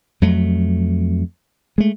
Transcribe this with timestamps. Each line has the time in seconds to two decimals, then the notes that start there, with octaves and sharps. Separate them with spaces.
0.22 F2 F#3 A3
1.78 G#3 A3